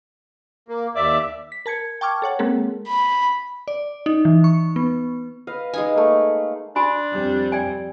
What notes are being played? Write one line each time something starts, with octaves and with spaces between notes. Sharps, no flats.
A#3
D#2 D5 E5
B6
A#4 A5 G#6 C#7
G5 A5 C#6 D6 F6 G#6
A4 C#5 F#5 A5
G#3 A#3 C4 G#4 A#4
B5
D5
D#4
E3
C#6
B3
B4 D#5 F5
G#3 D#4 F5 G#5
A3 A#3
D4 F#4 G#5 B5
F2 G3 C4
D5 G5 G#5